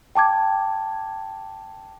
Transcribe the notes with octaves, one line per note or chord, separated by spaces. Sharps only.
G5 A5 D6 G#6